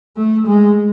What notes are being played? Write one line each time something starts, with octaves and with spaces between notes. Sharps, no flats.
A3
G#3